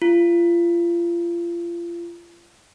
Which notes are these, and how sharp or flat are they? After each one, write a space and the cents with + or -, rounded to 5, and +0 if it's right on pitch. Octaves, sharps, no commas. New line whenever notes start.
F4 -30